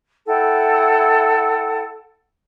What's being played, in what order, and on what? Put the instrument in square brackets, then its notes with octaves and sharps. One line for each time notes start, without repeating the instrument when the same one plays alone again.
[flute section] E4 A4 F#5 G5